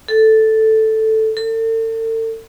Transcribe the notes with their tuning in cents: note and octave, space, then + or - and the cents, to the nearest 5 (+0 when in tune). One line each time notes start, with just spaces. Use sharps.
A4 +0
A4 +40